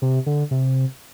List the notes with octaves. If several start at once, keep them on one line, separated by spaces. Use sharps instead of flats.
C3
D3
C3